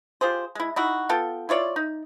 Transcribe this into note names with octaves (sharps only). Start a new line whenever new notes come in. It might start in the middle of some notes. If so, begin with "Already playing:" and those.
F4 G4 G#4 C5
G#3 E4
D#4 E4 F#4
B3 F4 A4 G5
E4 F4 C#5 D5
D#4